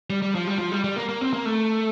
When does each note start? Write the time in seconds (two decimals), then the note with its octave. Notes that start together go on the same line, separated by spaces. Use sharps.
0.10 G3
0.22 G3
0.35 F3
0.47 G3
0.58 F3
0.72 G3
0.84 G3
0.96 A#3
1.09 A#3
1.21 C4
1.33 A#3
1.45 A3